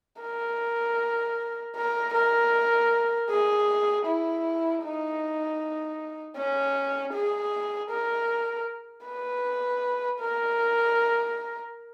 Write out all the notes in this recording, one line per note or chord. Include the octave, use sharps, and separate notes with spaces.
A#4
A#4
A#4
G#4
E4
D#4
C#4
G#4
A#4
B4
A#4